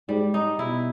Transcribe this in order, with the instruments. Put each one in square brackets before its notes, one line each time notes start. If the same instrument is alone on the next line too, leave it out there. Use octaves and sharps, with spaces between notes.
[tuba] G#2 [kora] G3
[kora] D#4
[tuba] B2 [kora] E4